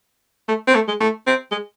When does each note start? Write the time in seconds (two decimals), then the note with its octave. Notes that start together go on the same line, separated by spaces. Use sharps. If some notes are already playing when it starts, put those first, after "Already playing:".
0.48 A3
0.67 C4
0.75 A3
0.88 G#3
1.00 A3
1.27 C4
1.51 G#3